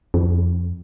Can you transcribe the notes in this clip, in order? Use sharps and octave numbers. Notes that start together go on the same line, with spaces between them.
F2